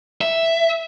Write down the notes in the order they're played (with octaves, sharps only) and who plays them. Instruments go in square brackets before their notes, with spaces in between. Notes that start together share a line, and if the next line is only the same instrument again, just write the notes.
[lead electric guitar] E5